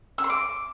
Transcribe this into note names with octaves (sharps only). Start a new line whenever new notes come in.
E6
C6
D6